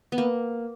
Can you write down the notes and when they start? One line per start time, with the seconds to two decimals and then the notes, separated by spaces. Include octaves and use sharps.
0.12 B3
0.18 A#3